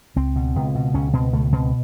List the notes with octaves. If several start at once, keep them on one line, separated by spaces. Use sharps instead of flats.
C#2 C4
B2
C#2
B2
C#2 C#4
B2 C4
C#2 A3
B2 C4